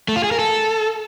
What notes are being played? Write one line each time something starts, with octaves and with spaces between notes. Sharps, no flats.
A3
F4
G#4
A#4
A4